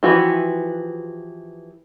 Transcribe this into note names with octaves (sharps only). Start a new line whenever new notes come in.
E3 F3 F#4 G4